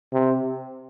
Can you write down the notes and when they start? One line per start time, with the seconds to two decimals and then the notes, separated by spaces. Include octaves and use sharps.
0.13 C3